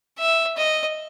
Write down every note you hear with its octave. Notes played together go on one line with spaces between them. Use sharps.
E5
D#5